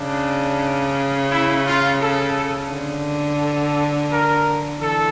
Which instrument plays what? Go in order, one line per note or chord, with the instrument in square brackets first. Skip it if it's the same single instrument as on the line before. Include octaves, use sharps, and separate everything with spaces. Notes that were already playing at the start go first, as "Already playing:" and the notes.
Already playing: [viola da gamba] C#3 [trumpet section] D4
[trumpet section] E4
F4
A4
[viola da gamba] D3
[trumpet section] A4
A#4
[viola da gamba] E3 [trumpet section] A4